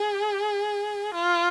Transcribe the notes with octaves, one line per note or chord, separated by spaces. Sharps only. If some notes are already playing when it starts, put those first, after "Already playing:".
Already playing: G#4
F4